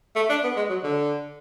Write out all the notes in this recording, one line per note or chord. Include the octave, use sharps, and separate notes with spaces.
A3
D4
B3
G#3
F#3
D3